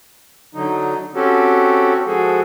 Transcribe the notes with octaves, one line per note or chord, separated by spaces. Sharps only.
D3 F#3 D#4
C4 C#4 F#4 G4 A4
F3 G#3 F#4 G#4 A4